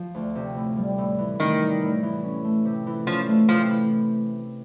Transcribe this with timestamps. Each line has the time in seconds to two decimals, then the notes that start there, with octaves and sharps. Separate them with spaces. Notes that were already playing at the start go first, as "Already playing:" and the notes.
Already playing: F3
0.15 D2
0.36 C3
0.56 A2
0.77 G3
0.98 A2
1.18 E3
1.40 A2 D#3
1.61 G3
1.82 A2
2.03 E3
2.23 C#4
2.44 A3
2.65 C3
2.86 E3
3.07 F3 C#4
3.28 A3
3.49 C3 F3
3.70 E3